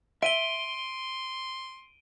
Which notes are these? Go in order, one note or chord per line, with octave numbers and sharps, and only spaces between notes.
E5 C6 D7 D#7 G7